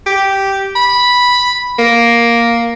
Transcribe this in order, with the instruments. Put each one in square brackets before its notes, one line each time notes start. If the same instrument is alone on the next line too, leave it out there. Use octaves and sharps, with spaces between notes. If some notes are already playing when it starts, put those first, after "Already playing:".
[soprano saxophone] G4
B5
A#3